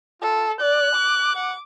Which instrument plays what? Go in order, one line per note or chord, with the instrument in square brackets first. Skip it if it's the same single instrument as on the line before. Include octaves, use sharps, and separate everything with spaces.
[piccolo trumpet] F4 [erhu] A4
[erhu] D5 [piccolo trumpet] F#6
[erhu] D6
[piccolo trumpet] F#5